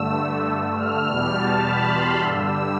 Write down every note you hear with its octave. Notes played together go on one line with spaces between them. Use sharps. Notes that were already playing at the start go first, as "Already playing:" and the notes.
Already playing: G2 D3 A3 E6
F6
E2 B2 G3
A5
B5
C6
G2 D3 G3 E6